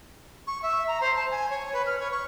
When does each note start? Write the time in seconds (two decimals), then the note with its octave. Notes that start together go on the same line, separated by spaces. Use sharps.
0.47 C#6
0.62 E5
0.87 A#5
1.01 C5
1.16 A5
1.31 G#5
1.50 C#5
1.73 B4
1.86 F6
1.99 C#5
2.12 C#6